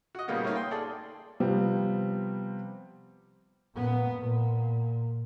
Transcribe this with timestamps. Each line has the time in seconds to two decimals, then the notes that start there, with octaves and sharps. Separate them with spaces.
0.15 F#4 D#5
0.28 A#2 C#3 G3 A#3 B3
0.43 A3 A#3 C#4 D#4
0.56 G5 C6
0.71 G#4 A4 D5
1.40 C3 F3 G3 B3 C4
3.76 A#2 B3
4.20 A#2